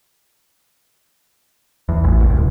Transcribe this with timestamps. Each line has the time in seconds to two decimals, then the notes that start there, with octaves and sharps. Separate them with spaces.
1.89 E2
2.04 A1
2.22 C2
2.37 D1